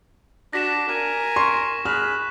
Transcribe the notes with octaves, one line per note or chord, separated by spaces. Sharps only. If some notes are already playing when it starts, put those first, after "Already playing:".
D4 F#4 A#6 B6 E7
A#4 G#5
C6 C#6
G#4 B5 F6 F#6